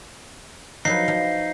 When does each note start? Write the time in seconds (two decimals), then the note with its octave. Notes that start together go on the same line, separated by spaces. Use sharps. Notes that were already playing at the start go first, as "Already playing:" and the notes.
0.85 F3 F#3 D#4 B4 C7
1.08 F3